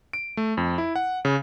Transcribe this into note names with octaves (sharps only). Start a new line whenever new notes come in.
D7
A3
F2
E4
F#5
C#3